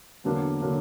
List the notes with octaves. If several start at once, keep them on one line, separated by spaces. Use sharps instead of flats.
E2 D3 F#3 A#3 D4
D3 F#3 A#3 D4